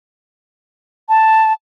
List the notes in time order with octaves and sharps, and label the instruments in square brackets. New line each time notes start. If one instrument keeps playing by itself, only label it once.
[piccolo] A5